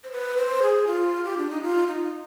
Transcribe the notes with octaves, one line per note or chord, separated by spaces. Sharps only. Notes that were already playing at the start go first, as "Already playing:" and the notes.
C5
B4
C5
G#4
F4
G4
D4
D#4
F4
D#4